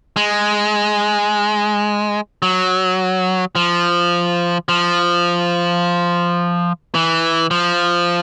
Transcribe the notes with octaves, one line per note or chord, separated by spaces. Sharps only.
G#3
F#3
F3
F3
E3
F3